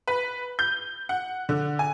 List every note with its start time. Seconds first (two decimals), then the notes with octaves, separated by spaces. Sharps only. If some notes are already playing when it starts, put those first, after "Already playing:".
0.08 B4
0.59 G6
1.09 F#5
1.49 D3
1.79 G#5